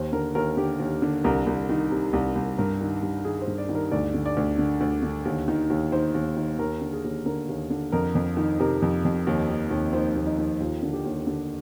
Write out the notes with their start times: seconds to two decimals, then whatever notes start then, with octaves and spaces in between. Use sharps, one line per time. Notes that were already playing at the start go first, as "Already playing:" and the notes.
Already playing: D#2 C5
0.12 D3 A#4
0.35 D#2 A#4
0.57 D3 G4
0.80 D#2
1.02 D3
1.24 C2 A#4
1.46 C2
1.69 D#3
1.92 C3
2.13 C2
2.35 C2
2.58 G2 A#4
2.81 D#3
3.03 G2
3.25 D#3 G#4
3.41 C5
3.47 G2
3.58 D5
3.69 D#3
3.75 A#4
3.92 D2 D5
4.14 D3
4.26 D5
4.37 D2
4.58 D3
4.81 D2
5.03 D3
5.25 D#2
5.48 D#3
5.70 D#2
5.92 D#3 C5
6.14 D#2
6.37 D#3
6.59 D#2 A#4
6.82 D3
6.93 G#4
7.04 D#2
7.26 D3 A#4
7.49 D#2
7.70 D3
7.92 F2 A#4
8.15 F2
8.37 D#3
8.60 C3 A#4
8.82 F2
9.05 F2
9.27 D#2
9.49 D#3
9.71 D#2
9.93 D#3 C5
10.16 D#2
10.27 D#4
10.38 D#3
10.60 D#2 F4
10.83 D3
10.93 G4
11.05 D#2
11.27 D3